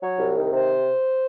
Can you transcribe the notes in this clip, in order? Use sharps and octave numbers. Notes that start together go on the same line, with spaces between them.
F#3 C#5
C2
D#3
C3 C5